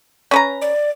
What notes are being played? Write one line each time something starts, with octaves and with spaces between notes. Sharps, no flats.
C#4 B4 A#5
D5